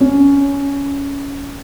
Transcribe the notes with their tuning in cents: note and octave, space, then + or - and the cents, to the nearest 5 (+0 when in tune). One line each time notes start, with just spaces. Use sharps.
C#4 +15